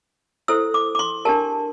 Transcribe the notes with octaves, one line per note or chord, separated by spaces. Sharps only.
E4 A4 C5 E6
D6
D6
C6
D4 G4 A#4 A5